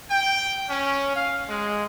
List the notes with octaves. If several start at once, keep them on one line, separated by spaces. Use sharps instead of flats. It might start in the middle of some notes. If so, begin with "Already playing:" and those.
G5
C#4
F5
G#3